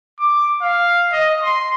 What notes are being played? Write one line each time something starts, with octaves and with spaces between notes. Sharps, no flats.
D6
F5
D#5
C6